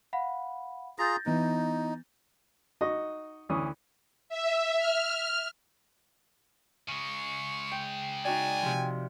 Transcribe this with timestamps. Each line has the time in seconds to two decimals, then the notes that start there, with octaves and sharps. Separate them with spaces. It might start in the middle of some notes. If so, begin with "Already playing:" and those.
0.13 F5 F#5 B5
0.99 F4 G#4 A#5 G6 A6 A#6
1.26 E3 B3 D#4
2.81 D#4 F#4 D#5
3.49 D2 E3 C#4 D#6
4.29 E5
4.78 F6
6.89 C#3 G#3 C#6
7.72 G5
8.25 D#4 F#4 D5 G5 G#5
8.62 C3 F3